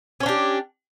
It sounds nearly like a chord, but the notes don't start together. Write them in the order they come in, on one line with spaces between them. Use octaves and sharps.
C#4 C#5 D4 G4